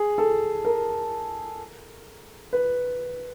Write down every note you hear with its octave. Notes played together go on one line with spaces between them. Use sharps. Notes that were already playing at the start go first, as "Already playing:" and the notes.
Already playing: G#4
A4
A#4
B4